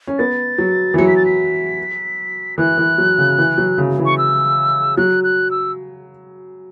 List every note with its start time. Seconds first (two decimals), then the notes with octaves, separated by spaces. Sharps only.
0.07 C#4
0.18 B3 A6
0.58 F#3
0.94 E3
0.98 F#3 C#7
1.07 B6
1.17 A6
1.26 B6
2.58 E3 F#6
2.78 E3
2.98 F#3
3.18 C#3
3.38 E3
3.58 F#3
3.78 C#3
3.98 E3
4.05 C#6
4.18 E6
4.97 F#3 F#6
5.24 F#6
5.51 E6